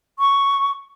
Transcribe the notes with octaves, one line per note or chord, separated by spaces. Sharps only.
C#6